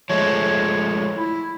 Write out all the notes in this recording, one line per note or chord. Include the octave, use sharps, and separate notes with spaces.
F3 G#3 A3 C#5
E4